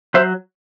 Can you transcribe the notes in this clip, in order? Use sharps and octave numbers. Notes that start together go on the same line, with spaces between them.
F#3 C5 E5